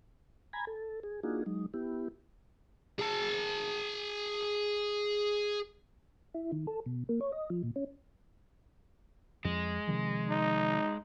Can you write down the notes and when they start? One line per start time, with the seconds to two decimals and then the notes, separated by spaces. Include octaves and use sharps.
0.53 G#5 A#5 B5 G#6
0.67 A4
1.03 G#4
1.23 A#3 D4 D#4 F4 F#4 G#4
1.46 F#3 G#3 D#4
1.74 B3 E4 G4
2.98 G#4 A5
6.34 E4
6.52 D#3
6.67 A4
6.86 B2
7.09 A#3
7.21 C#5
7.32 D#5
7.50 F3
7.63 A#2
7.76 C#4
9.45 F2 G#3
9.87 C3 D#3 F3
10.30 D#4